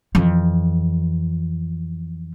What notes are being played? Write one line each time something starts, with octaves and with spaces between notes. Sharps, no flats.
F2 E3